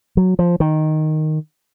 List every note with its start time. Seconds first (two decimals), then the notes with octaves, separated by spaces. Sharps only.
0.17 F#3
0.39 F3
0.60 D#3